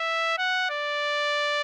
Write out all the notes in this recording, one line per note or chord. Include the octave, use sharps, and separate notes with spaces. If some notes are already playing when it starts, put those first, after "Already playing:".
Already playing: E5
F#5
D5